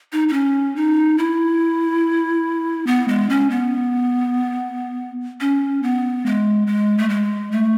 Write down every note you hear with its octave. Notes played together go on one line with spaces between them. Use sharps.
D#4
D#4
C#4
D#4
E4
B3
G#3
C#4
B3
C#4
B3
G#3
G#3
A3
G#3
A3